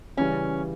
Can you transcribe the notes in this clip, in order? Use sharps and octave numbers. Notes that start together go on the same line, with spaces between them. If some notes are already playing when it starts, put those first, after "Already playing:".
C#3 E3 G3 C#4